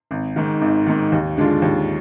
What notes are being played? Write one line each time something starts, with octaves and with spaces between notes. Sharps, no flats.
G#1
G#2 D#3
G#1
G#2 D#3
D#2
D3 G#3 D4 F4
D#2